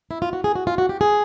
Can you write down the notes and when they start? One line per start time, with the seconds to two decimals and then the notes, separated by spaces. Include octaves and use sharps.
0.11 E4
0.22 F4
0.33 F#4
0.44 G#4
0.55 F#4
0.67 F4
0.78 F#4
0.89 G4
1.01 G#4